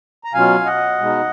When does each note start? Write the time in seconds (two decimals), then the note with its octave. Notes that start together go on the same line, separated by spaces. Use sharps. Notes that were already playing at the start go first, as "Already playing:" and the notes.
0.24 A#5
0.34 B2 F#3 C#4 F4 F5 G#5
0.66 D#5 F#5
0.99 B2 G#3 D#4